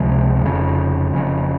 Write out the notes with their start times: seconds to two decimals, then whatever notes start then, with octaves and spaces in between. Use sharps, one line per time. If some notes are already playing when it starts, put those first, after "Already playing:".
Already playing: C#2 C3 F3 G#3
0.42 F1 F2 C#3
1.11 F#1 F2 C#3